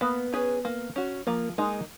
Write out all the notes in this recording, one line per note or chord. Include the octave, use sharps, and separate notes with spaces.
A#3 B3
C#4 G#4 B4
A#3
C#4 F#4
F3 A#3
G#3 A#3 D#4